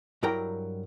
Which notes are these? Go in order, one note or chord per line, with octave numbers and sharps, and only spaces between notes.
G2 F#3 E4 A#4 G5 A#5